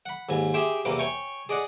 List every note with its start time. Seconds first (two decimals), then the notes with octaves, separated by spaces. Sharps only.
0.06 F#5 B5
0.29 D#2 G#2 G#5
0.54 G4 G#4 E5 G5 C6
0.85 E2 C3 E3 A#3 D6
0.99 C#5 G5 G#5 C#6
1.49 G#4 D5 D#5 F#5